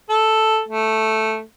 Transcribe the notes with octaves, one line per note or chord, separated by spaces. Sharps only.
A4
A3